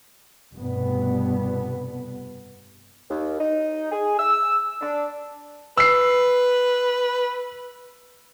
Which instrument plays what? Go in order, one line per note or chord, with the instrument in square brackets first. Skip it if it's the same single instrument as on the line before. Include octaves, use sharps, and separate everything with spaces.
[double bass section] F1 G2 B2 B3
[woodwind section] D#2
D#4
G#4
E6
D4
[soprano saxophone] B4 [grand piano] E6 C7